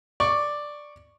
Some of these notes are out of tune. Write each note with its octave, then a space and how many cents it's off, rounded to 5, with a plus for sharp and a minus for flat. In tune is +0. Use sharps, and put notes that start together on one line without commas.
D5 +5 C#6 +0